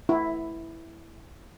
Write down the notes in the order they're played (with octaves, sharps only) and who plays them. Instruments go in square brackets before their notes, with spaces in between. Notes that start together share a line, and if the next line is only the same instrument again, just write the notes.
[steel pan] E4